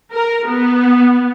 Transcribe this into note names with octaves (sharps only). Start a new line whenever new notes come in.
A#4
B3